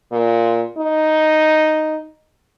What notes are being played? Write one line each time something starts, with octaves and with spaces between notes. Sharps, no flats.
A#2
D#4